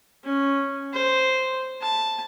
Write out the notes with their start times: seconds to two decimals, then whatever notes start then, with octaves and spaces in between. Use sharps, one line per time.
0.24 C#4
0.93 C5
1.81 A5